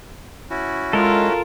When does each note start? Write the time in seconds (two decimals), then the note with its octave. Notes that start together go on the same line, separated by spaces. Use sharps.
0.50 C#4 E4 F#4
0.93 G#3 F4 A4 A#4